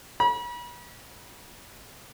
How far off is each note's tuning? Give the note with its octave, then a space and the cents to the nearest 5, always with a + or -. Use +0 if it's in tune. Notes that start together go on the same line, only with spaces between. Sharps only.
B5 -40